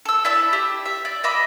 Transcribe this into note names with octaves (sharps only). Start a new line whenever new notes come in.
A4 E6
E4 D5 E5 A5
G4
E5
D5
D#5 E5 B5 D6